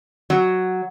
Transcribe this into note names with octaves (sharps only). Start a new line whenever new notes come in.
F#3